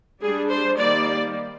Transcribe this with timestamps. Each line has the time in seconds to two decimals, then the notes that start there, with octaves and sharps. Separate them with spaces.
0.21 G3 D4 G#4
0.50 C5
0.78 D#3 G3 A#3 D5